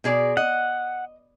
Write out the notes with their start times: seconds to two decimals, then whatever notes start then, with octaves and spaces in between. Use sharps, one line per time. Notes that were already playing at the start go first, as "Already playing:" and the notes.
0.04 B2 G#4 D5
0.37 D#5 F#5